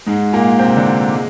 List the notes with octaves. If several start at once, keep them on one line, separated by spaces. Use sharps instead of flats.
G#2 G#3
A#2 A#3
C3 C4
D3 D4
G#3